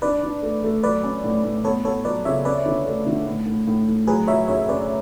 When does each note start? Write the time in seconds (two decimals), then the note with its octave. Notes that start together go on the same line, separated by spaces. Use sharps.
0.02 D4 B4 D5
0.23 D4
0.43 A3
0.64 A3
0.83 F#3 B4 D5
1.04 C#4
1.24 A2
1.44 A2
1.64 B3 A4 C#5
1.84 B3 A4 C#5
2.05 F#3 B4 D5
2.25 C#3 C#5 E5
2.45 C#4 B4 D5
2.66 D3
2.86 A3
3.06 D3
3.26 A2
3.46 A2
3.67 A2
3.88 A2
4.07 F#3 G#4 B4
4.28 F#3 C#5 E5
4.48 F#2 C#5 E5
4.59 E5
4.69 C#4 B4 D5